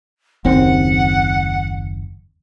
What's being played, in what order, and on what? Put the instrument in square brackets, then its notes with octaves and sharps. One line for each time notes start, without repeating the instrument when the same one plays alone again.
[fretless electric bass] F#1 D#2 C4 [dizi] F#5